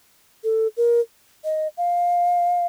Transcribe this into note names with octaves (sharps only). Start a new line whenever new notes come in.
A4
A#4
D#5
F5